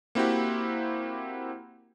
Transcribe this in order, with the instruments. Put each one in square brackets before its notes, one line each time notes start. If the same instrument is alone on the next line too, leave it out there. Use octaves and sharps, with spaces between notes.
[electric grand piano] A#3 C4 E4 F#4 G4